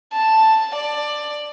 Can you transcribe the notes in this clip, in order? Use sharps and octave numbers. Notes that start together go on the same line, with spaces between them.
A5
D5